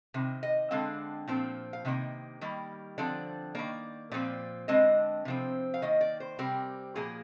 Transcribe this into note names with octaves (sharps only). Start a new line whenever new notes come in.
C3 D#3
D#5
D3 G#3 C4 F5
A#2 F3 C4
F5
C3 D#3 A#3
D#3 G3 A#3
D3 F3 C4 D5
D#3 A#3 D5
A#2 F3 C4 D5
D3 G#3 C4 D#5
C3 F3 C4
F5
D#3 A#3 D#5
D5
C5
C3 G3 C4 A#4
A#2 F3 A#3 G#4